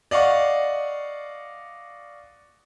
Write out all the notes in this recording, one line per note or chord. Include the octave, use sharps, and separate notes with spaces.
D5 D#5 F5 F#5 C#6